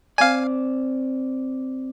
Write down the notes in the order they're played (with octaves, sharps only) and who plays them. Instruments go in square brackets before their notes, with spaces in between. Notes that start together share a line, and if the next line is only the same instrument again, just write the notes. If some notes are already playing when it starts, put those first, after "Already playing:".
[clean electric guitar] C4 D5 [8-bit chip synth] F5 G#5